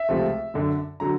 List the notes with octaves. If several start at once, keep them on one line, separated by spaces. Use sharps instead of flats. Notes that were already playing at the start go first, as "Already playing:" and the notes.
Already playing: E5
C#2 C3 F3 A3
F#2 D3 F#3
D3 F#3 A#5